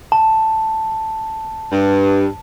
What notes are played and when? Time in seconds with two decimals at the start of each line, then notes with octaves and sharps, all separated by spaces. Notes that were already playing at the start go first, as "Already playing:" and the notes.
0.12 A5
1.71 G2